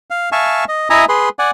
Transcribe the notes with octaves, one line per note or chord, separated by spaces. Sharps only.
F5
E5 F5 G#5 A5 C#6
D#5
E4 D#5 E5 G#5 A#5 D#6
G#4 B4 C6
D5 F#5 G#5